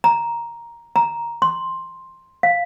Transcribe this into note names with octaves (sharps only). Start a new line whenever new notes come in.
A#5
A#5
C6
F5